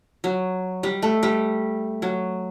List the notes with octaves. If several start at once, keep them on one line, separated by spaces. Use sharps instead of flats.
F#3
G3
A3
G3
F#3